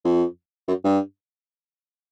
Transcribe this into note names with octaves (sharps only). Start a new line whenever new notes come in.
F2
F#2
G2